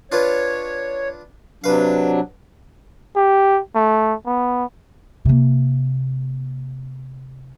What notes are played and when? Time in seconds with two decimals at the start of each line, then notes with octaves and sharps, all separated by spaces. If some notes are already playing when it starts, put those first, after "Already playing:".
0.12 D4 F4 B4 C#5
1.64 C3 F#3 D4 B4 F5
3.16 G4
3.75 A3
4.26 B3
5.25 C3 A#3